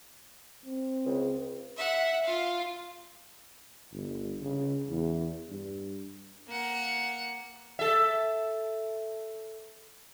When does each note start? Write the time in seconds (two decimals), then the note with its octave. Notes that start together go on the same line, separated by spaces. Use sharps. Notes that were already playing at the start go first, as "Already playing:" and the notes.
0.66 C4
1.06 C#2
1.77 E5 F#5
2.26 F4 F5
3.93 G1
4.42 C#3
4.89 E2
5.50 G2
6.48 A#3 F#5
7.79 A4 E5